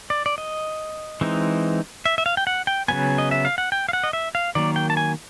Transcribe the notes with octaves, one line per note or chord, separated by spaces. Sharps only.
D5
D5
D#5
E3 G#3 C4 D#4
E5
E5
F5
G5
F#5
G5
C#3 F#3 B3 G#5
D#5
E5
F5
F#5
G5
F5
F#5
D#5
E5
F5
D#3 F#3 A#3 D5
G5
A5
G#5